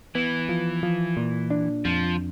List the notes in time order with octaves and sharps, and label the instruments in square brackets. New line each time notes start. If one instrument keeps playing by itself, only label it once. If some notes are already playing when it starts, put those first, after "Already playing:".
[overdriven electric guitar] E3 [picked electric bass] B3
[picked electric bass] F3
F3
A#2
D4
[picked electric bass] F2 [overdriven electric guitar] F3